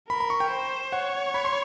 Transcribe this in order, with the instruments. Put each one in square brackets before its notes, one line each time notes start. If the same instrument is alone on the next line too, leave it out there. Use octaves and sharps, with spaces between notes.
[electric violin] A#4 [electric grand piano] B5
[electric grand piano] B5
C#6
G5
[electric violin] C5
[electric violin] C#5 [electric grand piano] F#5
[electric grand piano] B5
C6